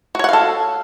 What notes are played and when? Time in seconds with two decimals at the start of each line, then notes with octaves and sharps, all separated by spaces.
0.15 F#4
0.19 C#5
0.24 F#5
0.29 F5
0.33 A4